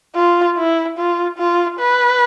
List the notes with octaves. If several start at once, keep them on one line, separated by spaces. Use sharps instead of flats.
F4
E4
F4
F4
B4